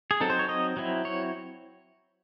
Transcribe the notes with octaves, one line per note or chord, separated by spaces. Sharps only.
G#4
F#3 C4 D#4 A4
C5
C#5
D#5
F#3 C4 E4
C#5